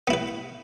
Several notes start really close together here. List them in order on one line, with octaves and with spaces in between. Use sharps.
B3 E4 B4